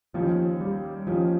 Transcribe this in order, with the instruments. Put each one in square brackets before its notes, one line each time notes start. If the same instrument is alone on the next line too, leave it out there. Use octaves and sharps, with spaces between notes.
[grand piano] D#2 D#3 A#3 C#4 G4 [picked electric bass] F3
[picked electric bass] G3
[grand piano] D#2 D#3 A#3 C#4 G4 [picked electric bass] F3